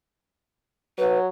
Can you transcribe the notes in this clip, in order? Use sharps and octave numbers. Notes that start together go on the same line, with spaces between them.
F#3 B4